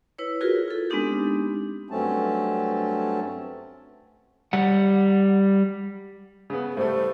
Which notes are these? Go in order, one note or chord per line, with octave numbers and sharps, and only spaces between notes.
E4 B4 C#5
F4 F#4 G#4 A#4 B4
F4 A4
G#3 B3 C4 D4 D#4 G4
G2 F#3 A3 C4 C#4 A5
G3 F#5
C#3 B3
A2 G3 A3 C5